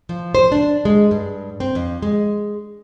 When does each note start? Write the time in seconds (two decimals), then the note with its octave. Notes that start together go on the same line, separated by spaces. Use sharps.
0.09 F3
0.35 C5
0.52 D4
0.85 G#3
1.11 G2
1.60 C4
1.75 F2
2.02 G#3